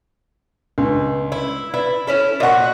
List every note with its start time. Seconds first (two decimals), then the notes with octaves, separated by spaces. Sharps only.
0.78 C#2 G2
1.32 E4
1.74 E4 B4 D5
2.07 C#4 E4 A4
2.40 A#2 F#4 D#5 F#5 C#6